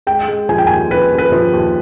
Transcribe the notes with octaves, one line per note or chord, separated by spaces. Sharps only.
G#3 G5
G#3
F3 G#5
G5
G#5
D#2
F3 B4
D#2
B4
F3
D#2